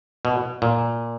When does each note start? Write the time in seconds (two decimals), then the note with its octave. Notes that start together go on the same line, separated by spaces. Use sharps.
0.25 B2
0.62 A#2